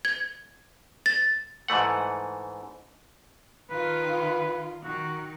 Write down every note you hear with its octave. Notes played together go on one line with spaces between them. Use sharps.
G#6
A6
G#2 E3 A3 F#5
D#3 F4 B4
D#3 F#4